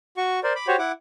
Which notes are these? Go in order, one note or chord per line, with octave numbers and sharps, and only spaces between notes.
F#4 C#6
A#4 C5 D5
B5 D6
F#4 G4 C5 C#5
E4 F#5 D6